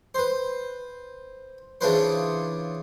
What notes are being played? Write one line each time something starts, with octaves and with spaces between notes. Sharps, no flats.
B4 C5
C#3 E3 D4 F4 B4 C5